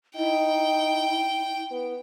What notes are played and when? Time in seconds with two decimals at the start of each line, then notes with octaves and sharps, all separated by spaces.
0.16 D#4 E4 G5
1.71 B3